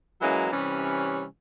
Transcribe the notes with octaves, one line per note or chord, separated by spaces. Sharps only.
E3 F#3 G#3 A#3 C#4 E4
C3 E3 G3 C#4